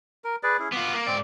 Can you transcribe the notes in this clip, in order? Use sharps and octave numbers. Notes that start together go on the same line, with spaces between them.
A#4
G#4 B4 D5
C#4 E4 G#4
B3 F4 D6
A#3
G#2 C4 D5